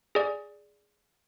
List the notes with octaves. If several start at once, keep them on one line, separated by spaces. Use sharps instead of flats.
G#4 D5